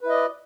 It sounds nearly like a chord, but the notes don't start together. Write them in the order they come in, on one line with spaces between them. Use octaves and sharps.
B4 E4 D#5 D5